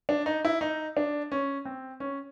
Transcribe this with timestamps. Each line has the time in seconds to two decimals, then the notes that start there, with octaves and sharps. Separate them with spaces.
0.09 D4
0.26 D#4
0.45 E4
0.61 D#4
0.97 D4
1.32 C#4
1.65 C4
2.00 C#4